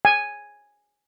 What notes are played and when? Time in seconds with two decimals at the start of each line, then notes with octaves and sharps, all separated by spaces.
0.05 G#5